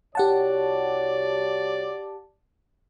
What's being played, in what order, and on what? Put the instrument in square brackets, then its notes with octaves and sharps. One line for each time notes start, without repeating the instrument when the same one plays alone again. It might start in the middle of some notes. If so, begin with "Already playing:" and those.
[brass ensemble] C2 F#4 C#5 [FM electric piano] G4 F#5 A5 [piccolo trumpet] D5